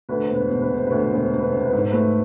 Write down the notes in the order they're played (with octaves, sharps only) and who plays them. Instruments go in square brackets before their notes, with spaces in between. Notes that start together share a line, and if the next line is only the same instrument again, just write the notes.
[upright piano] D2 B4
C5
E1
B4
E1 C5
B4
C3 C5
D2 B4
C5
E1 B4
C5
E1
B4
C3 C5
B4
G#2
C5
A3 B4